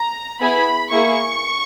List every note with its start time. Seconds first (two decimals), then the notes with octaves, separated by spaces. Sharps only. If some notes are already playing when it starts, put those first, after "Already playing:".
Already playing: A#5
0.40 B3 E4 G#4 B5
0.91 A#3 E4 G#4 C#6